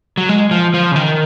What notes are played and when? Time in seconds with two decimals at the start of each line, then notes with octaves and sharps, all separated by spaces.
0.18 F#3
0.29 G#3
0.51 F3
0.74 F3
0.92 C#3
0.96 D#3